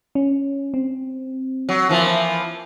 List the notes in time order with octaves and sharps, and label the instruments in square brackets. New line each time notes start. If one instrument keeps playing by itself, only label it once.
[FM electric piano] C#4
C4
[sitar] F#3
E3 F3 A#3